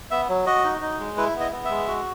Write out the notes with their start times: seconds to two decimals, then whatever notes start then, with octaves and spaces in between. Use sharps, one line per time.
0.11 B3 E5
0.29 F#3
0.46 F#4 D#5
0.64 D#4
0.82 D#4
0.99 G#3
1.17 E4 B4
1.35 B3
1.40 D#5
1.52 B3
1.65 G#3 E5
1.87 F#4